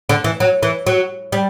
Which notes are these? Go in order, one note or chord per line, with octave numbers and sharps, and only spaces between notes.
D3
E3
F#3
E3
F#3
G3